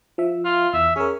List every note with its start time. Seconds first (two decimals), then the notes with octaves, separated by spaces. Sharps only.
0.18 F3 E5
0.45 F4
0.74 E2 E5
0.96 C#4 G#4 A#4